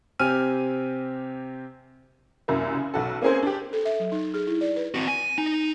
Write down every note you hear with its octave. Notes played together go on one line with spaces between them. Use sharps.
C3 C4 G4 G#5 F6 D#7
C2 F#2 A#3
C#3
B1 F#4 A4
A#3 C4 C#4 G#4 A#4 C5
D4 G4
A4
E5
F#3
D#4
G#4
E4
D5
B4
C4 F#4
G#5
D#4